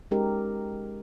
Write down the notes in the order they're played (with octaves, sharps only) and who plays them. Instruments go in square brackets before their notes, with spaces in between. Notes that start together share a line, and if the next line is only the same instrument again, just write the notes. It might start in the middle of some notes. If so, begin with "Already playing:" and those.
[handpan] G#3 C#4 D#4 G4 A#4